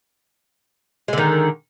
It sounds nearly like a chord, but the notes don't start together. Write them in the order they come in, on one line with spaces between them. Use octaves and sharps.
G#3 D3 D#3